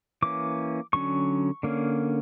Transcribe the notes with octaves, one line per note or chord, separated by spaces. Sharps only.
E3 A#3 C#4 D6
D3 F#3 C#4 C#6
D3 A#3 C#4